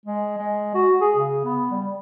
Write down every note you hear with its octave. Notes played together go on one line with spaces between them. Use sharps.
G#3
G#3
F#4
G#4
C#3
B3
G3